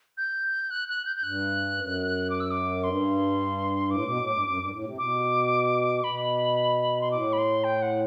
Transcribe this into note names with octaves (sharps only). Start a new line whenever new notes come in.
G6
F#6
F#6
G6
G6
G2 F#6
F#2
D6
E6
D6
G2 C6
A2 D6
B2
A2
G2
F#2
G2
A2
C3
B2 D6
B2 B5
C6
A2 D6
B5
C6
G5
F#5